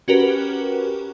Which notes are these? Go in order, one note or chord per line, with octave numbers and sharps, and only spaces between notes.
C#4 F#4 G4 A#4 B4